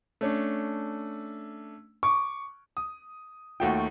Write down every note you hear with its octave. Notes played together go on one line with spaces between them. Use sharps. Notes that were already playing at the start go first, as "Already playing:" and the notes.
A3 C#4 D4
C#6 D6
D#6
D#2 A3 F4 F#4 G5